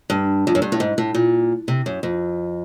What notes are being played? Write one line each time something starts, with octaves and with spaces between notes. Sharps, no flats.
G2
F2
F#2
G2
A2
G#2
A2
A#2
C3
F#2
F2